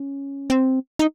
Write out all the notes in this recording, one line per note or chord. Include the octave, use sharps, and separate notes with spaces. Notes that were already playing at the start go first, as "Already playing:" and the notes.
Already playing: C#4
C4
D#4